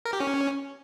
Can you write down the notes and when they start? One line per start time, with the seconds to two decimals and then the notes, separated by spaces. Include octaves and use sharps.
0.05 A#4
0.13 G4
0.20 C#4